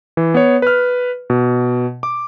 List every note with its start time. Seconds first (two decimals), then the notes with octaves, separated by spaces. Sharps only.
0.17 E3
0.34 B3 C#5
0.62 B4 F6
1.30 B2
2.03 D6